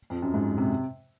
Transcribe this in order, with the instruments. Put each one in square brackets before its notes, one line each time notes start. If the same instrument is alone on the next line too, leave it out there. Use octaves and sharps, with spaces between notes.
[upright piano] F2
F#2
G#2
C3